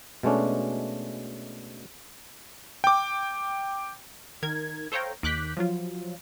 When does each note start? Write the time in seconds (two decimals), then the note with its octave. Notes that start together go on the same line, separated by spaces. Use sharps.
0.23 B2 G#3 A3 C#4 D4
2.84 G5 D6
4.43 D#3 A#4 G#6
4.92 A4 C5 C#5 F5 G5 A#5
5.23 D#2 D6 F#6 G6 B6
5.57 F3 F#3 F4